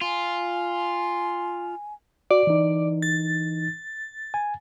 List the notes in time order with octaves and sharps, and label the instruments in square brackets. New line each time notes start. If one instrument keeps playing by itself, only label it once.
[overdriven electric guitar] F4 [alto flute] G#5
[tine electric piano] F#4 [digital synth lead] D5
[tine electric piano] E3 D#4
[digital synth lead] A6
[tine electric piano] G#5